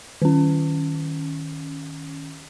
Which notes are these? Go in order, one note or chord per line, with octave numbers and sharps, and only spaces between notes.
D#3 C#4